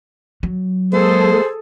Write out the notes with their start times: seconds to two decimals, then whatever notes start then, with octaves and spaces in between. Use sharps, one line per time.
0.43 F#3
0.93 G#3 A#3 G#4 A4 C5